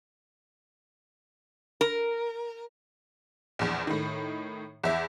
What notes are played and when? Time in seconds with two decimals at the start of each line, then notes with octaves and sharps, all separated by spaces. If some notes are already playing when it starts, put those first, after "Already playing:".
1.81 A#4
3.59 A#1 E2
3.87 A2 D#3
4.84 E2 E5